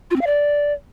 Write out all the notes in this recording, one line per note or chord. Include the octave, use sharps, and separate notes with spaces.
F4
C4
F5
D5